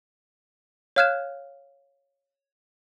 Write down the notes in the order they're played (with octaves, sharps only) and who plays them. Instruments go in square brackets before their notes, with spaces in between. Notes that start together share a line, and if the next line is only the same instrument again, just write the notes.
[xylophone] C#5 F5 F6 F#6 G#6 E7